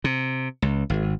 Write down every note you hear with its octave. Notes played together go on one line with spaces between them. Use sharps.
C3
C#2
G#1